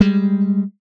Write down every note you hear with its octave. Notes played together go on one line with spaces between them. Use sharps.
G3 G#3